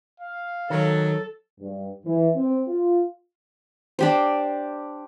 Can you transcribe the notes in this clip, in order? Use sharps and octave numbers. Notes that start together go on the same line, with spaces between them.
F5
D#3 F#3 A4
G2
E3
C4
F4
D4 G4 C5